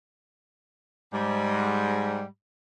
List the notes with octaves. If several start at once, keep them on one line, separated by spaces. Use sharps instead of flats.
G#2 G3